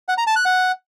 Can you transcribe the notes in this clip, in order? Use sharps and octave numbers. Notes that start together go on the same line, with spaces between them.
F#5
A#5
A5
F#6
F#5